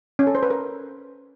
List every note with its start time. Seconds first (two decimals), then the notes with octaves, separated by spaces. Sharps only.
0.19 C#4
0.27 A4
0.35 C5
0.43 B4
0.50 A#4